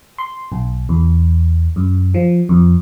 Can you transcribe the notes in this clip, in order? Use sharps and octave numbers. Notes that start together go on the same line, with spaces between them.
C6
B1
E2
F#2
F3
F2